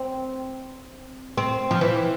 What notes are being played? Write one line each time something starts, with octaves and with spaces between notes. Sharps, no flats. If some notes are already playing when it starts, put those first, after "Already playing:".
Already playing: C4
C4
F3
E3